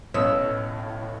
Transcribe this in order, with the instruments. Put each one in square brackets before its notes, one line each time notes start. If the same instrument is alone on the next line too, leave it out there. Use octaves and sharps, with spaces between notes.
[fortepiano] B1 C#4 D#6 [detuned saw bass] A2 [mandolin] E6